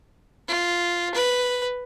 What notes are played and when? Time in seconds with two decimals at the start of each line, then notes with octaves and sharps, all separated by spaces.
0.48 F4
1.15 B4